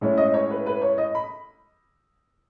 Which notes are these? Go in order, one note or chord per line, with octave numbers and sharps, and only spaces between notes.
A2 G#3 C#4 E4
D#5
C#5
B4
B4
C#5
D#5
B5